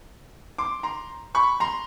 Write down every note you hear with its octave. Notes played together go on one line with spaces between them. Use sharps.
C6 D6
A#5 C6
B5 C#6
A#5 C6